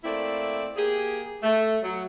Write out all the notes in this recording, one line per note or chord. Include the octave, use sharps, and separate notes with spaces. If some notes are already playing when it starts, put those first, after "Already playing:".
A3 A#3 C4 E4 D5
A#3 G4 G#4
A3
F#3